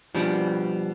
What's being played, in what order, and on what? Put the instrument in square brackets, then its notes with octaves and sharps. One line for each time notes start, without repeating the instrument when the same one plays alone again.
[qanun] B2 D5 F#5 [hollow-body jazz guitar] F3 G3 D4